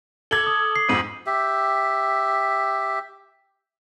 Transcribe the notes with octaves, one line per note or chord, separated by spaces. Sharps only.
A4 D6 G#6 F#7 G7
D#6
C7
F2 G#2 B6 D#7 F#7
G4 E5